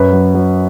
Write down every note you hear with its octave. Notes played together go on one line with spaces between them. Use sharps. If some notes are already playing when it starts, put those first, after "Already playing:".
Already playing: F#2 B4
F#3
F#3